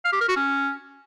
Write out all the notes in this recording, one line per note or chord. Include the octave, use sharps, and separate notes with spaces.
F5
G4
A#4
F#4
C#4